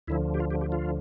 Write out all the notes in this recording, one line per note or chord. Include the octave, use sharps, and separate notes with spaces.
D2 D3 F3 E4
G4
F4
G4
G4
F4